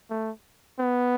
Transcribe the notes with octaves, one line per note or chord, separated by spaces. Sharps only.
A3
B3